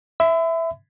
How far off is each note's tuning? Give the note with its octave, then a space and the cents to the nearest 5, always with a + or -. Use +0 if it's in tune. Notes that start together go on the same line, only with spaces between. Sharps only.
E5 +0 B5 +40